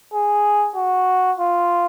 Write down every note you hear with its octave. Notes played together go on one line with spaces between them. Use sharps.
G#4
F#4
F4